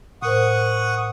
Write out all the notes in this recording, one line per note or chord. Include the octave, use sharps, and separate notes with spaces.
A2 A#4 C5 F#5 C#6 D#6